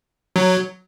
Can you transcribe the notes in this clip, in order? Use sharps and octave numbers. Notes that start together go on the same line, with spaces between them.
F#3